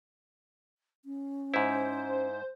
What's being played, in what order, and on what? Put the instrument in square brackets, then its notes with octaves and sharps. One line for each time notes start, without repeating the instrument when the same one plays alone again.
[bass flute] C#4
[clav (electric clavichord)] G#2 E4 [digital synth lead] C5